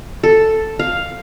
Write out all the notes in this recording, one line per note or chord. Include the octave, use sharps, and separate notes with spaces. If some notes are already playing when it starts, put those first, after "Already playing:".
A4
F5